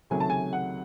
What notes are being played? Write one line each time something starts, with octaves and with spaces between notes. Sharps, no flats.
C#2 C3 D#3 F#3 A3 G#5
A5
G#5
F#5